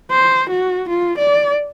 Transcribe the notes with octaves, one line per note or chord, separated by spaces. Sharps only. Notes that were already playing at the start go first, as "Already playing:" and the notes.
C5
F#4
F4
D5